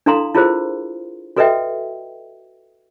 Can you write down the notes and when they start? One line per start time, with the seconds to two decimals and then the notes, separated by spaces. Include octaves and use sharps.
0.06 D4 E4 A4 F5 A#5 C6
0.34 E4 F4 G#4 A#4 C5
1.36 F#4 A4 B4 D#5 E5 G5